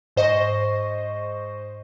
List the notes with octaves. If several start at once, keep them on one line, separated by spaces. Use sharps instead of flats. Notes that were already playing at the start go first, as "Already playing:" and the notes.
G#2 C5 D#5 C#6 A#6